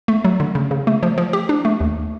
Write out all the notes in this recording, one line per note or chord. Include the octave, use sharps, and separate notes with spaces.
A3
F#3
D3
C#3
C#3
A3
F3
F3
G4
D4
A3
D#2